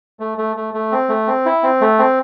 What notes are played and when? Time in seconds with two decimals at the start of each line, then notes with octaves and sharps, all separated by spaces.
0.20 A3
0.38 A3
0.56 A3
0.74 A3
0.92 C4
1.09 A3
1.28 C4
1.46 E4
1.63 C4
1.81 A3
1.99 C4